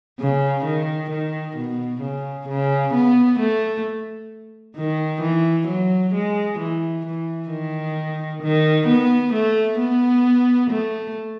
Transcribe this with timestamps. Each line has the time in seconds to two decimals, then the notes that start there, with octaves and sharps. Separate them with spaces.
0.20 C#3
0.65 D#3
1.10 D#3
1.57 B2
2.01 C#3
2.48 C#3
2.94 B3
3.39 A3
4.76 D#3
5.21 E3
5.67 F#3
6.14 G#3
6.59 E3
7.06 E3
7.51 D#3
8.43 D#3
8.87 B3
9.33 A3
9.80 B3
10.70 A3